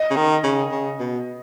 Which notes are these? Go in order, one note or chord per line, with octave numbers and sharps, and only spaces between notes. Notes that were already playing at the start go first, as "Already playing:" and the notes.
Already playing: D#5
C#3
D#3
C#3
C#3
B2